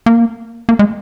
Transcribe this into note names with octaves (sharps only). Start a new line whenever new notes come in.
A#3
A#3
G#3